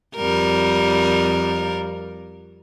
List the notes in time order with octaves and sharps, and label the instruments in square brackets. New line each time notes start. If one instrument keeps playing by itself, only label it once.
[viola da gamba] F2 G3 A#4